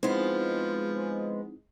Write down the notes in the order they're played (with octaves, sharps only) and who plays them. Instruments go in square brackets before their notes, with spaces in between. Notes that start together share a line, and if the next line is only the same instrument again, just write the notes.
[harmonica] F3 [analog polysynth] G#3 [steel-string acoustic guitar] B3 C5 [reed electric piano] C4 D#4 E4